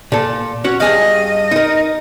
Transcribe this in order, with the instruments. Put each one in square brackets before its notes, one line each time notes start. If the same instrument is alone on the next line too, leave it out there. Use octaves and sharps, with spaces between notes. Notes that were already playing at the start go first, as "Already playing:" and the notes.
[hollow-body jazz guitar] A#2 A4
C#4 F#4 C#5
[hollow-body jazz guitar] G2 G#4 F5 [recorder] D#5
[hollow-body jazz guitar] D#4 A#4